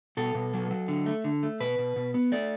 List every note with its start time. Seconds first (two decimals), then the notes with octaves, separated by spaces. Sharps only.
0.17 B2 A4
0.35 B2
0.54 F#3
0.71 F#3
0.88 D3
1.06 A3
1.24 D3
1.43 A3
1.60 B2 B4
1.78 B2
1.96 B2
2.14 B3
2.32 A3 D5